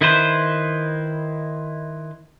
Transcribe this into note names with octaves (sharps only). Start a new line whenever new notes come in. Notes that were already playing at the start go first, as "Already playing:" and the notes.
D#3 E4 B4 C5